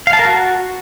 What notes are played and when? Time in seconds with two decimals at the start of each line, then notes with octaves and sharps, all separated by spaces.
0.07 F5
0.13 A5
0.19 A#4
0.25 F#4